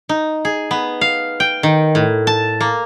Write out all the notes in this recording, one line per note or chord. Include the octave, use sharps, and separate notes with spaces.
D#4
G#4
B3
F5
G5
D#3
A2
A5
A#3